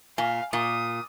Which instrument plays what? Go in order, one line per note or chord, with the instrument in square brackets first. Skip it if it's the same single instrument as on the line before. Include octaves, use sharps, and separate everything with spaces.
[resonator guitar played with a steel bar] A#2 [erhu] F5 [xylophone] G#5
[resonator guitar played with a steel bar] A#2 [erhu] D#6